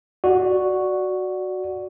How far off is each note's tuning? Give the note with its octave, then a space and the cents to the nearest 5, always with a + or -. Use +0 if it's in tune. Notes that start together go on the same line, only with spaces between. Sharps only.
F#4 +0 D5 +0